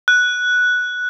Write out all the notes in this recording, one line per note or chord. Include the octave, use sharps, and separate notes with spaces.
F#6